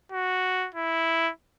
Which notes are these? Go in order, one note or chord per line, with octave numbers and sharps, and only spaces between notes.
F#4
E4